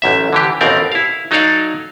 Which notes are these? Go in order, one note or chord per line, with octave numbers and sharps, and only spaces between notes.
A1 F#2 E5
D3 E3 G4
A1 D#2 B2 C4 A#4 D5
E4 F5
F#3 D#4 A4 C#5 D5 F5